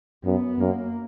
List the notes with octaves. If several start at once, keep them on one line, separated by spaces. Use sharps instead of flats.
F#2 B3
F#2 A#3